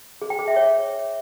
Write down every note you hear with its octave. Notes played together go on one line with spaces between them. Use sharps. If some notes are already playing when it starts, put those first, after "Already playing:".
G#4
G5
G#4
E5
C#5